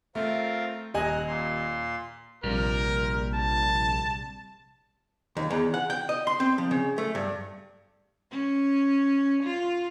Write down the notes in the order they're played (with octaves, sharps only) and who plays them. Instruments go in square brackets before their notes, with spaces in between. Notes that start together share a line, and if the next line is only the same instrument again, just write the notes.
[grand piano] A3 [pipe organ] C4 F4 A#4
[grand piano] D#1 D#5 G#5 [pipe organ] A#5 F#6
[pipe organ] A#2 C6
[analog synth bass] A#1 [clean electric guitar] C3 G3 [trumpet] A#4
[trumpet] A5
[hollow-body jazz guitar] D#2
E2
F#5
G5
D#5
C6
C4
F3
C#3
A3
G2
[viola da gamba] C#4
F4